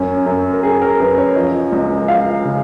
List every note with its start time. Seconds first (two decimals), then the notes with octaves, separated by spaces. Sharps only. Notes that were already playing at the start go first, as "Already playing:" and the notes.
Already playing: F#2 C#4
0.26 F#2
0.53 A#4
0.63 F#2 G#4
0.81 A#4
1.00 F#2 B4
1.18 C#5
1.36 F3 D#5
1.72 C#2
2.08 F3 F5
2.45 C#3